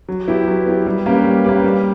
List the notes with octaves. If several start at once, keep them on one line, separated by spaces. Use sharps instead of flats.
F#3
B3 E4 G4
F#3
B3 E4 G4
G3
A#3 C#4 G4 B4
G3
A#3 C#4 G4 B4
G3